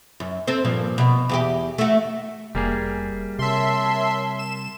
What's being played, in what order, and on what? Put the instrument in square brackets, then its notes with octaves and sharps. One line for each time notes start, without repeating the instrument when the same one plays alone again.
[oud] F#2
C4 A4 C5
G2 A#2 F3
B2
E2 F4 G4
A3 F#4
[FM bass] F1 [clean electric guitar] G3 A#3 G#4
[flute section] E5
[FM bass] C3 [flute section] A#4 C#5 A5 [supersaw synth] E5 C6
[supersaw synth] E7